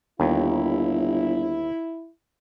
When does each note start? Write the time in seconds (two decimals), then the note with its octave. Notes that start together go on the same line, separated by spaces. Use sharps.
0.20 G1 D#2 E4